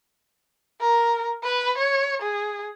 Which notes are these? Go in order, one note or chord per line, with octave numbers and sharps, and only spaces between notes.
A#4
B4
C#5
G#4